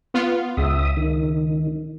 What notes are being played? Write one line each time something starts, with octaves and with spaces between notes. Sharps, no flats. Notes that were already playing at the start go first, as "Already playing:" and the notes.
B3 F4
C#2 E5 D#6
D#3